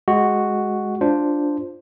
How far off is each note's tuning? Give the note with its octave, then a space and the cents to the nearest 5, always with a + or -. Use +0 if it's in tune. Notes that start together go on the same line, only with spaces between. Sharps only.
G#3 +0 F#4 +0
D4 +0 F4 +0 C5 +0